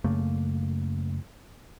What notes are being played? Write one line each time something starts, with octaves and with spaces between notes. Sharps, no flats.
F#2 C#3 A3 A#3